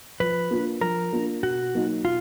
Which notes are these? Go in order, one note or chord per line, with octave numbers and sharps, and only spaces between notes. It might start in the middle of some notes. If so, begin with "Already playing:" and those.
F3 B4
A#3 D4 F4
F3 A#4
A#3 D4 F4
B2 F#4
F#3 A#3 D#4
B2 F4